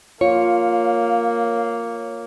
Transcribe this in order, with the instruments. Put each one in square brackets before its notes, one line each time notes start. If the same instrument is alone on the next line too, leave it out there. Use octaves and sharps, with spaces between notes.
[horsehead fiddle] A#3 [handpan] F4 [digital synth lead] C#5 [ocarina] F5